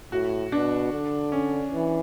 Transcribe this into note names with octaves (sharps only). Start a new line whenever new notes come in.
A2 F#4
B2 D4
D3
C#4
E3